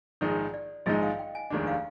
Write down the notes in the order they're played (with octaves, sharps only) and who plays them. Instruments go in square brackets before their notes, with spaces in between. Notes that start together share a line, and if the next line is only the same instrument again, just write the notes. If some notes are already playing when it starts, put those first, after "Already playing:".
[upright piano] A#1 G#2 D#3 G#3 D#4 [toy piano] D5
[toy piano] D5
[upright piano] A#1 G#2 D#3 G#3 D#4 [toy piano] D#5
[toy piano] F5
G5
G#5
[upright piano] F1 D#2 D#3 G#3 D4
[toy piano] F5